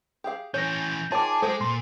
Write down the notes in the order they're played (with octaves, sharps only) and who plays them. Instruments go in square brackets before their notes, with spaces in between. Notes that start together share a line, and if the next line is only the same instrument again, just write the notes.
[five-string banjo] G4 G#4 F5
[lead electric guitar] E3 C#4 [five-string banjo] C#5 [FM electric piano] G6 A#6
[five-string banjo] D#3 F4 C#5 [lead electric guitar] G#4 [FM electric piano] A5 D6
[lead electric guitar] G#3 [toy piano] A4 [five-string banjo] C5 G5
[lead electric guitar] A#2 [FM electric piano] C6